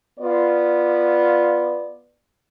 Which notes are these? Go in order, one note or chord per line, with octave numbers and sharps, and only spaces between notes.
B3 F4 D5